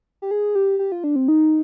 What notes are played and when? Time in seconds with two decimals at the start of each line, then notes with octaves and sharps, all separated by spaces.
0.22 G4
0.31 G#4
0.55 G4
0.79 G4
0.92 F4
1.04 D4
1.16 C4
1.28 D#4